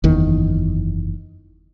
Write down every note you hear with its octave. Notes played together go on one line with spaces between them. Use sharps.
F#1 E2 D#3